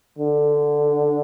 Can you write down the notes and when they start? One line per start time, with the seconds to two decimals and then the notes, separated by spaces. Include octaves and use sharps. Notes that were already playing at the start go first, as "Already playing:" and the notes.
0.18 D3